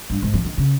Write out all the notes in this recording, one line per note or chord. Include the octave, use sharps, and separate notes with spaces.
G2
G#2
E3
D#3
C#3